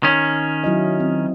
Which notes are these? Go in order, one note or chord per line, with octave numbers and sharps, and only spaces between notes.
D#3 C#4
F#3 E4 D#5
C4